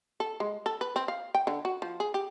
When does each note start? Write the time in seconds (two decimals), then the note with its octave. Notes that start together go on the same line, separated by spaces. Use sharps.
0.20 A4
0.40 G#3
0.66 A4
0.81 B4
0.96 C4
1.08 F5
1.35 G5
1.47 D3
1.65 F#4
1.82 F3
2.00 G#4
2.14 G4